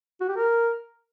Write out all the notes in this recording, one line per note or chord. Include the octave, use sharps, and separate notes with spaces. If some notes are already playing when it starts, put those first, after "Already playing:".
F#4
G4
A#4